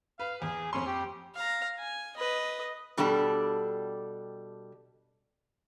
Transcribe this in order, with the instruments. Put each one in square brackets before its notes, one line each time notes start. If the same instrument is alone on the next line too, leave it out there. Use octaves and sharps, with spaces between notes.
[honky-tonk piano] B4 [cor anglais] F5
[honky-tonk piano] E2 [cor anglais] G#4
[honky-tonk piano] F2 C4 C6 [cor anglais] C#4
[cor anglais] G4
[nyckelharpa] F5 A#5
G#5
B4 D#5
[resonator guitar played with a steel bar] B2 G3 D4 G4 A4